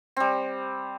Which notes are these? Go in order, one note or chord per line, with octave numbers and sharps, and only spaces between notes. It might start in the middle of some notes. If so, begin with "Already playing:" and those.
G3 C4